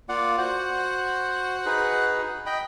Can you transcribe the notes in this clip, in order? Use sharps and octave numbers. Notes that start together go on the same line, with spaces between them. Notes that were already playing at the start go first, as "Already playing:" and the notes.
A#3 F4 D5 F#5
F#4 C5 F#5
D#4 G#4 B4
D#5 G5 B5